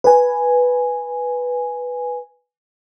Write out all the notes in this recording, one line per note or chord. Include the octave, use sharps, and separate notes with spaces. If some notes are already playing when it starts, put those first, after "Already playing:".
B4 G#5